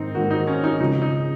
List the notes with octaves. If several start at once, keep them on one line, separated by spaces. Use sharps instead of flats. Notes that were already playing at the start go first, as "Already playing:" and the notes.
Already playing: G#2 D#3 A#3 C4 D#4
G#2 D#3 A#3 F#4
D#4
C#4
D#4
C#2 C#3 F3 G#3 D#4
D#4